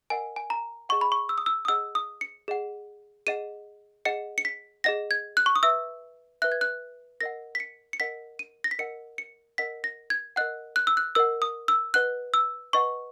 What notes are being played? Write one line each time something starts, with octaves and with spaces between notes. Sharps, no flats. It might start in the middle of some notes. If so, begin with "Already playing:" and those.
A#4 D#5 F#5 G#5
G#5
A#5
G#4 D#5 F#5 C#6
B5
C#6
E6
D#6
E6
D#6
G#4 D#5 F#5 E6
D#6
C#7
G#4 D#5 F#5
G#4 D#5 F#5 D#7
G#4 D#5 F#5 C#7
C#7
B6
G#4 D#5 F#5 A#6
G#6
F#6
C#6
D#6
B4 E5 E6
B4 E5 F#6
G#6
F#6
A#4 D#5 F#5 A#6
B6
C#7
C#7
A#4 D#5 F#5 B6
D#7
A#6
B6
A#4 D#5 F#5 C#7
C#7
A#4 D#5 F#5 B6
A#6
G#6
A#4 D#5 F#5 F#6
F#6
E6
F#6
A#4 D#5 F#5 E6
D#6
E6
B4 D#5 F#5 F#6
E6
B4 D#5 F#5 C#6